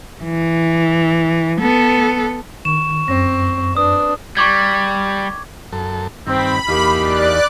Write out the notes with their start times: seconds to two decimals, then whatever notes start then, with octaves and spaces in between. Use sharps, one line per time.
0.23 E3
1.61 B3 A4
2.65 D#3 C#6 E7
3.08 F#2 C4 A#6
3.77 D4 B4 D#6
4.37 G3 C#6 D6 G#6
5.73 F#2 A4
6.27 G2 D#3 C4 B5
6.68 E2 A#3 D#4 G4 F5
7.01 D5 F#6